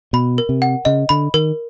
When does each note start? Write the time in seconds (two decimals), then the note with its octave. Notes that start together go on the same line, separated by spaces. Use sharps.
0.13 B2 B5
0.38 A#4
0.49 C3
0.62 F#5
0.85 C#3 D#5
1.09 D3 B5
1.34 D#3 A#4